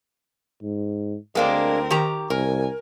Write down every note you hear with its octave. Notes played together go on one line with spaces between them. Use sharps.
G#2
D2 G#3 A#3 C4 D4 A#4
D#3 G4 A#5
C2 A#4 G#5